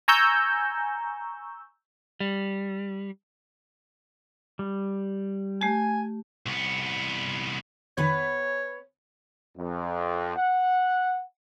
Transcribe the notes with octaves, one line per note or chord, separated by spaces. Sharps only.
G#5 A#5 C#6 E6 G6
G3
G3
A3 G4 G#5
C2 B3
F2 D#3 B3 B4 C#5 G#5
F2
F#5